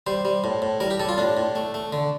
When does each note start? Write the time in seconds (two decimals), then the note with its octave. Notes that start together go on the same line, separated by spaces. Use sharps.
0.07 G3 C5
0.25 G3
0.44 A2
0.62 A2
0.80 G3 A#4
0.90 G4
1.00 G3 A4
1.09 F4
1.18 A2 D4
1.37 A2
1.55 A3
1.74 A3
1.93 D3